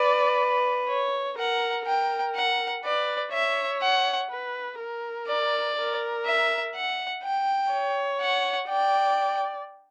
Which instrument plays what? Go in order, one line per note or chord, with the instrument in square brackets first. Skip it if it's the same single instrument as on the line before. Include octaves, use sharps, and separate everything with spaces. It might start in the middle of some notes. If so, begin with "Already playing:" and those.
Already playing: [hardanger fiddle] B4 [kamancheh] D5
[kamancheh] C#5
[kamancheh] A#4 [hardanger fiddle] F#5
[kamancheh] A#4 [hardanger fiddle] G5
[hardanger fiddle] F#5
[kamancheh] B4 [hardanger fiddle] D5
[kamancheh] C#5 [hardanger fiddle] E5
[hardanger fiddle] F#5
[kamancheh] B4
A#4
[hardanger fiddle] D5
[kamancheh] A#4
[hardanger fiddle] E5
F#5
G5
[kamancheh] C#5
[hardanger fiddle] F#5
[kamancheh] D5 [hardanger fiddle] G5